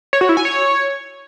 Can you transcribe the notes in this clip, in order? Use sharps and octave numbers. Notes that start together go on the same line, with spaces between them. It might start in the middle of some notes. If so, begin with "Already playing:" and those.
C#5
F#4
E4
G#5
C#5